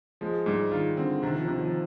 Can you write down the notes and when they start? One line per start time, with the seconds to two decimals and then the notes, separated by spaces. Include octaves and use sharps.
0.21 F3 G#3
0.46 G#2 G3
0.71 D#3 F4
0.97 D3 C4
1.22 C3 D#3
1.35 F3
1.47 C3 D#3
1.59 F3